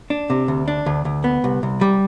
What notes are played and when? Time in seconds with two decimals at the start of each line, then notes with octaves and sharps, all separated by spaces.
0.10 D4
0.30 C3
0.48 D2
0.68 D4
0.86 D2
1.05 D2
1.24 B3
1.44 C2
1.63 C2
1.81 G3